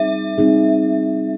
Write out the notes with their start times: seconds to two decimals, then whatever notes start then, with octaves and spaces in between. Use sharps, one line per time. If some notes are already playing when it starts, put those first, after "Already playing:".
Already playing: G3 C4 D#4 G#4 E5
0.38 G3 C4 D#4 G#4